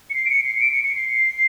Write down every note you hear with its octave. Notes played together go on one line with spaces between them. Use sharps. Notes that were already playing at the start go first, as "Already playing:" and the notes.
C#7
C7
D7
C#7
C7
D7
C#7
C#7
C7